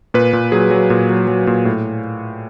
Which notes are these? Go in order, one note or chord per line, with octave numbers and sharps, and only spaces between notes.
A#2 B4
A#2
F#3 G#4
F#3
A#2
F#3
F#3
A#2
A2